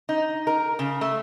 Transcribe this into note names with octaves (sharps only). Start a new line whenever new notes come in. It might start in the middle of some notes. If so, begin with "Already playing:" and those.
D#4
A#4
C#3
A3